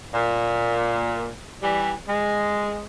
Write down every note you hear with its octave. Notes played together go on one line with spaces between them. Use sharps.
A#2
E3 G3
G#3